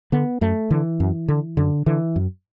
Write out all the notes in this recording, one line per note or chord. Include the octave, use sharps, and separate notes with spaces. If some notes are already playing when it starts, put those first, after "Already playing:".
D3 B3
F#2 A3
D3 E3
F#2
D3
F#2 D3
D3 E3
F#2